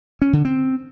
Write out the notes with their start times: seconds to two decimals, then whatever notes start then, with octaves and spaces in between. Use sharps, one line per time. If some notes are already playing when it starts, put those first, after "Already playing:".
0.22 C#4
0.33 D3
0.45 C4